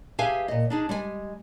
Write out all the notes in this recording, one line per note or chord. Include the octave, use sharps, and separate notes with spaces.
G4 G#4 B4 E5 F5 G#5
A#2 D#5
D4 D#4 G#4
G3 G#3 D5 G#5